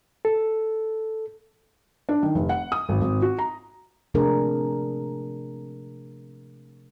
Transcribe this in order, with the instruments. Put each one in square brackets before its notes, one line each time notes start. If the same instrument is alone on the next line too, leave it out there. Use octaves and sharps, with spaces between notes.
[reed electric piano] A4
[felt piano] D4
D#3
F1
F#5
D#6
G#1
G#1
F#4
A#5
[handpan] C3 F3 A3 D4 G#4 A#4